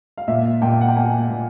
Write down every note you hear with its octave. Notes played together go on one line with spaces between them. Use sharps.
F5
A#2 E5
A#2 G5
F#5
G5
A#3 G#5
A#2